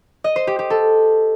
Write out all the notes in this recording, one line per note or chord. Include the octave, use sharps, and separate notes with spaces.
D#5
C5
G4
G4
A4